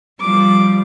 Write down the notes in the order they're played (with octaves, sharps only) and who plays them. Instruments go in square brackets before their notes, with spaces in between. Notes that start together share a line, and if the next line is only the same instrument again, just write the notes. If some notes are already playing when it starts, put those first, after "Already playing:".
[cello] F3 G3 [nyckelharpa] D6